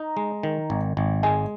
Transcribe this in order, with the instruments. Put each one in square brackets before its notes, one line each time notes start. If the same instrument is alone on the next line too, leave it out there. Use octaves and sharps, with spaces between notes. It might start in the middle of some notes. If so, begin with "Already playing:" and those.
Already playing: [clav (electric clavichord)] D#4 [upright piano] A#5
[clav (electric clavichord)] G#3
D#3
G#1
G#1
[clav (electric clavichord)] G#3 [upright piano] G#5